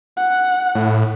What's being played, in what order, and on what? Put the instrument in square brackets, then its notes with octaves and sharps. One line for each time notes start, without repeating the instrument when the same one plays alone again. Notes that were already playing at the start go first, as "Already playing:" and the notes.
[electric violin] F#5
[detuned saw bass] A2